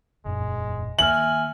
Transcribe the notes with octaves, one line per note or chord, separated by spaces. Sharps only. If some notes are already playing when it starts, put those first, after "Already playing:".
E1 F#2 A#2 G#3
D#3 A#3 E5 G#5 F6 F#7